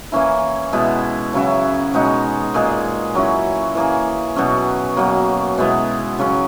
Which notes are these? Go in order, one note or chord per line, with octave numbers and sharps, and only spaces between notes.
E3 A#3 C#4 E4
B2 G#3 B3 E4
C#3 F#3 C#4 E4
B2 G#3 D#4 F#4
A#2 G#3 D#4 G#4
F#3 C#4 E4
E3 A#3 C#4 G#4
B2 F#3 C#4
B2 F#3 A#3
B2 G#3 B3 E4
C#3 F#3 C#4